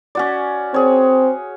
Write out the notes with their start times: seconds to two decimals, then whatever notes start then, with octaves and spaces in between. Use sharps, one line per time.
0.15 C#4 F#4 D5
0.74 C4 G#4 C#5